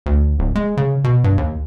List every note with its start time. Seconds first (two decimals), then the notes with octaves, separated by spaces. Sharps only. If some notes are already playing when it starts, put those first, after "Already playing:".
0.06 D2
0.39 D1
0.55 G#3
0.77 C#3
1.04 B2
1.24 G2
1.38 D#2